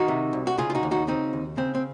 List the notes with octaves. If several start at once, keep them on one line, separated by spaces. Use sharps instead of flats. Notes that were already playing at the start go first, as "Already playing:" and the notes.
Already playing: D#3 D#4 F#4
C3
C2
F#4
C#3 F4 G#4
F4
D#4 F#4
D#2
D#4 F#4
C#3 C4 D#4
D#2
C#3 C4
C4